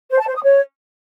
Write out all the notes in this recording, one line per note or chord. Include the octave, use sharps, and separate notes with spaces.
C5
A5
C5
D#6
C#5